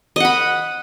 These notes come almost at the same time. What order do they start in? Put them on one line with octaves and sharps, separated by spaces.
D#5 F#5 B5